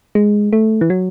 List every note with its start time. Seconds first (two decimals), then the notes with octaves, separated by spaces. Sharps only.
0.15 G#3
0.53 A3
0.81 E3
0.90 F#3